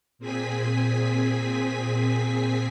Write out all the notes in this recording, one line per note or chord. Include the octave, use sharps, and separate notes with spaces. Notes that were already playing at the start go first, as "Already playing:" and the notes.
A#2 C4 G#4 G#5 B6